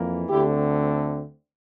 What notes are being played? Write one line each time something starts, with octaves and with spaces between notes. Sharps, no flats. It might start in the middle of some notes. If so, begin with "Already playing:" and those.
Already playing: F2 E3 A#3
D2 D3 A3 C4 E4 G4